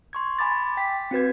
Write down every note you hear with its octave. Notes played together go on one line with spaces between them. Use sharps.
C6 C#6 G#6
G#5 B5 D6 A6
G5 B6
C4 F#4 B4 G#6